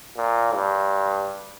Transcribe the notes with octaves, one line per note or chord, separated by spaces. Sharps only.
A#2
G2